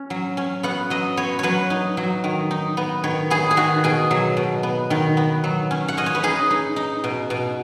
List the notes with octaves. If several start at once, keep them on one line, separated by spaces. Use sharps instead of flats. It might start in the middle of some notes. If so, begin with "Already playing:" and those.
Already playing: C#4
F#3
C#4
B3 F#5
F#3 D#5
B3 C#5
F#3 B4 C#5
D#4
F#3
D#3
D#4
B3
D#3 C#5
B3 G#4
G#4
D#3 F#4
B2 G#4
F#3
B2
B3
D#3
B3
F#3
C#4
F#5
C#4 D#5
C#5
B4
D#4 G#4
D#4
D#4
B2
B2